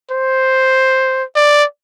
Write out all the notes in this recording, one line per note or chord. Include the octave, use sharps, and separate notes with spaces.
C5
D5